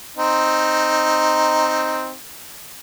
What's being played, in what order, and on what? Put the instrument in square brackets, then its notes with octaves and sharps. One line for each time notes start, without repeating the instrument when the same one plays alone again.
[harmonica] C4 D#4